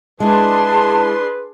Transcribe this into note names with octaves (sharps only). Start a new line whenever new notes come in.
G#3 D4 E4 G#4 B4 A5 C6